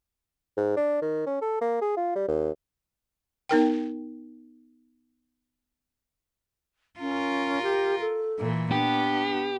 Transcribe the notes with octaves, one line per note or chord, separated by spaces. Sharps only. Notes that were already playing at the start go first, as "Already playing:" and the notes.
G#2
D4
D#3
C#4
A4
A#3
G#4
F4
G3
D#2
B3 D#4 A#4 G5
C#4 F4 A#4
G4
A4
A#2 E3
B3 D4 G4